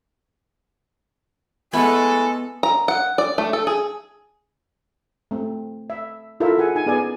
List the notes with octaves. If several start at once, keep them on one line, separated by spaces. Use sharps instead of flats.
G#3 A3 B3 E4 A4 B4 G#5 C#6
A#5
F#5
D5
A3
A4
G#4
A3 C4
E5
E4 F4 A4 A#4 E5
G#4 F#5 G#5
D#4 G#5
B3 G#4 D5 G#5